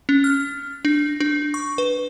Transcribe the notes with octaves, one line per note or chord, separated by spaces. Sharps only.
C#4
F6
D4
D4
C#6
B4